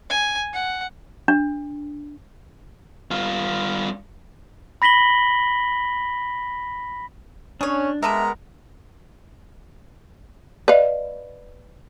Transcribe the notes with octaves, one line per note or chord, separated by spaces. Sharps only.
G#5
F#5
D4
G2 F4
B5 A#6 B6 F#7 G7
C#4 D4 G#4 C#5
D3 G#3 B3 A4 A#4 E5 A#5
B4 D5 D#5 F5